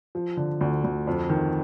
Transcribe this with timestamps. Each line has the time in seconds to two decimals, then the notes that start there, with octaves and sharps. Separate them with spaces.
0.15 F3
0.37 D3
0.61 D2
0.84 D2
1.07 F2
1.30 D#3